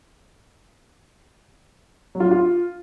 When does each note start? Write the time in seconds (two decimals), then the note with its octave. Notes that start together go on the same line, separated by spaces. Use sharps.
2.15 F#3
2.20 F4
2.26 D4
2.31 F4